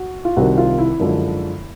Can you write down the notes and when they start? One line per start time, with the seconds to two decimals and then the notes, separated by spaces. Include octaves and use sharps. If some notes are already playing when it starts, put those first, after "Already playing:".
Already playing: F#4
0.25 F4
0.37 C2 C3 D#3 F#4
0.58 F4
0.79 E4
1.00 F#2 D3 F3 G#3